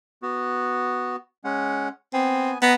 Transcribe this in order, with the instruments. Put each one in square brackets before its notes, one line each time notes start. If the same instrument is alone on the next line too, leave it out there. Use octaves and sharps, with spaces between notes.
[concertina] B3 F#4
G#3 C#4 F#5
[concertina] B3 G#5 [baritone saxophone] C4
[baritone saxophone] B3 [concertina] B4 D#5 A#5